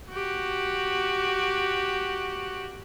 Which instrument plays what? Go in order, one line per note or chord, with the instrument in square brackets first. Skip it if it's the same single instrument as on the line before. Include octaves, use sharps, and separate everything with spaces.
[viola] F#4 G4